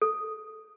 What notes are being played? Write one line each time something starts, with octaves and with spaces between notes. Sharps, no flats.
A4